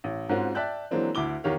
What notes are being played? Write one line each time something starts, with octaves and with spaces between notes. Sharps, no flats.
A1
G#2 C4 C#4 F4 F#4
D5 E5 G5 A5 F#6 G6
E3 F#3 G#3 A#3 C4 D4
D2 E4 D6 G7
E2 D#3 G4 C#5 F5